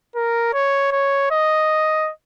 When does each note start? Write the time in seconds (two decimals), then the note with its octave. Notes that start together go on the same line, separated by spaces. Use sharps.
0.16 A#4
0.54 C#5
0.92 C#5
1.31 D#5